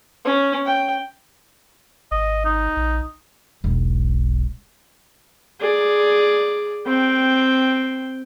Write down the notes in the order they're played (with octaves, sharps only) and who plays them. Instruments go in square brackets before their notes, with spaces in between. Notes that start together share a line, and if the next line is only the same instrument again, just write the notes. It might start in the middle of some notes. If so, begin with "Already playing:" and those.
[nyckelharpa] C#4
G5
[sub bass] G#1 [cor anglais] D#5
[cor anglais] D#4
[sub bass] A#1
[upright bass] E1 B1
[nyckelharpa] G#4 D5
C4 G5